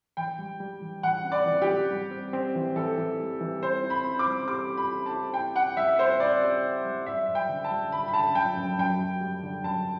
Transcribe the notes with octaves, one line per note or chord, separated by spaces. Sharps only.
E3 G5
G3
G3
E3
E3 F#5
C4
D5
E3
G4
G3
G3
C4
C4
E3
E3 A4
E3
G3
E3
C4 C5
E4
B5
C4
D6
G3
G4 D6
G4
B5
E4
A5
E4
E4 G5
E4 F#5
G3 E5
C4 C5
C4 D5
G4
E4
G3
F#2 E5
F#2
G5
D3
A5
G3
D3 B5
B5
D3 A5
F#2 G5
F#2
F#2 G5
F#2
G3
D3
F#2 A5